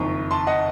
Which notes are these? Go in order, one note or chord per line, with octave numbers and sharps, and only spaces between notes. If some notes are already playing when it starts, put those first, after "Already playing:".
Already playing: F#1 F2 D#3 A#5 C#6
A5 C6
D#5 F#5